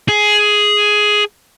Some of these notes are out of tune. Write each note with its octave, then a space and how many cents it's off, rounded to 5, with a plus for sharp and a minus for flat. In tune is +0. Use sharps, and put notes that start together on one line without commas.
G#4 +10